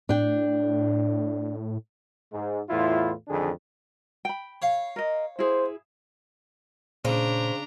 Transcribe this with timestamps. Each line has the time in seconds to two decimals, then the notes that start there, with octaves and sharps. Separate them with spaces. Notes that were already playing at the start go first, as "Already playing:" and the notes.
0.09 A2 D4 G5
2.33 G#2
2.69 E2 A2 E4 F4
3.28 A1 F2 D3 D#3 D4 G#4
4.25 G5 B5
4.62 C#5 F5
4.96 A#4 D#5
5.39 E4 G#4 C5
7.05 A#2 C#3 D4 C5 A#5